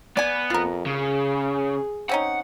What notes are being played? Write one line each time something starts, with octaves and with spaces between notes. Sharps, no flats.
B3 D5 G#5
F2 F4 A#4
C#3 G#4
C4 C#4 D#4 F#5